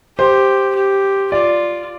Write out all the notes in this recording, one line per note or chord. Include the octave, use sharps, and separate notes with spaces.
G4 C5
G4
F4 D5